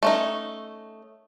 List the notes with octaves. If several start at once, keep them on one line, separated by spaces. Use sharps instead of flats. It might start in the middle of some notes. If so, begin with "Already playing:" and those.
A3 C#4 D#4